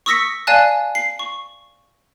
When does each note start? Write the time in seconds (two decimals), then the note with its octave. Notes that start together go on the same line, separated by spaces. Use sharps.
0.06 C#6 D#6 E6 A#6 B6 C#7
0.47 D5 F5 G#5 A5 F#6
0.95 C7
1.19 C#6